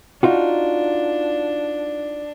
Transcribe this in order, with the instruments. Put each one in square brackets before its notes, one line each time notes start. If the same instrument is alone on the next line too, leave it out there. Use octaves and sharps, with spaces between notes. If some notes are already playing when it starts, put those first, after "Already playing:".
[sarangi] D4 [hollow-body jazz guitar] D#4 F4 F#4